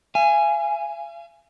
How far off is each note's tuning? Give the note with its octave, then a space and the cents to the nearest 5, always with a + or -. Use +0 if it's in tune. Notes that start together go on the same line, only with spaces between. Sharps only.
F5 -45 G#5 +0